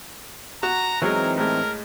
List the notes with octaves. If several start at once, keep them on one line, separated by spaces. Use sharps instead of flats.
F#4 A#5
E3 F#3 G#3 C4 D#4 A#4
A2 G#3 A#4